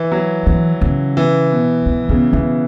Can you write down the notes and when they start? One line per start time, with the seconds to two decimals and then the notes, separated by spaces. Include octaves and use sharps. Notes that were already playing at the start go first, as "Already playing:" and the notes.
Already playing: E3
0.12 F#3
0.47 E3
0.81 C#3
1.17 E3
1.51 B2
1.86 E3
2.09 C#3 B3
2.33 E3 B3